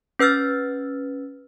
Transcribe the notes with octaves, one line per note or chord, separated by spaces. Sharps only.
C#4 B4 E6 F6 A6